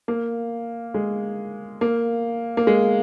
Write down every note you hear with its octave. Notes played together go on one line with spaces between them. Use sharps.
A#3
G#3
A#3
A#3
G#3